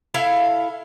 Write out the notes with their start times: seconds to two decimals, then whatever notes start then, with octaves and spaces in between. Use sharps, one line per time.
0.14 E4 A4 E5 F5